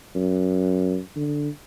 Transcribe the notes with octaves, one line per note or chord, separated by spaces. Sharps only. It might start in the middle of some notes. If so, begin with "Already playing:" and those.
F#2
D3